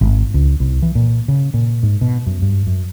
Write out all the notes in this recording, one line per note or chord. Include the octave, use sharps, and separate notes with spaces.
G#1
C#2
C2
E3
A#2
C#3
A#2
G#2
B2
F#2
G2
F#2